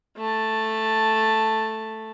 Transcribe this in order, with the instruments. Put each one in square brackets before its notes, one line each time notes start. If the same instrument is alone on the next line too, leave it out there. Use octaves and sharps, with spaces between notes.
[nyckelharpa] A3 A5